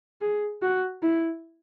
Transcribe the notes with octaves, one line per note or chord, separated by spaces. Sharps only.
G#4
F#4
E4